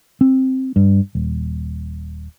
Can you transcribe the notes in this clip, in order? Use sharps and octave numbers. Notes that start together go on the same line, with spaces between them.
C4
G2
D#1